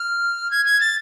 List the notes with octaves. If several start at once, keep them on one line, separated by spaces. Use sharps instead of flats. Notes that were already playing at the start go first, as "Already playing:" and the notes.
Already playing: F6
G#6
G#6
A6